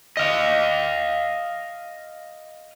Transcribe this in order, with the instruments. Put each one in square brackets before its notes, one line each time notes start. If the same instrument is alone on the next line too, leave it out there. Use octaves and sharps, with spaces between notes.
[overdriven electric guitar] D#5 F5